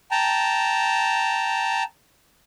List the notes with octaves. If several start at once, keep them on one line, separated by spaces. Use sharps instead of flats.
G5 A5 A#5